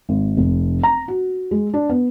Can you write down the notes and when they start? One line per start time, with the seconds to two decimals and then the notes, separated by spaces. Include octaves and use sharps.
0.09 G#1
0.37 F1
0.83 A#5
1.08 F#4
1.51 G#3
1.74 D4
1.90 B3